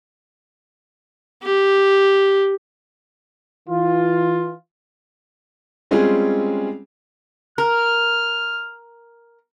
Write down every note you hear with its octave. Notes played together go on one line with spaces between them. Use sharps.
G4
E3 F4
G3 G#3 C4 C#4 F4 G#4
A#4 F6